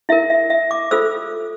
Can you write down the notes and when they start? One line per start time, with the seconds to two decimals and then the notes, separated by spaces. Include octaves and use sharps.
0.09 E4 A#4 E5
0.30 E5
0.50 E5
0.71 D6
0.91 F4 A4 C5 E6